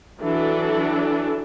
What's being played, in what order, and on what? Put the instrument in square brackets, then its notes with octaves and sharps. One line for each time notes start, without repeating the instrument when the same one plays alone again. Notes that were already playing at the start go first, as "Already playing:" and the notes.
[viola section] E3 F#3 D4 A4